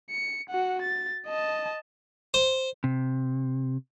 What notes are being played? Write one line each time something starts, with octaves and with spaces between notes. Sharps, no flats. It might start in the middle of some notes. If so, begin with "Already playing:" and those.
C#7
F#4 F#5
A6
D#5 A5
C5
C3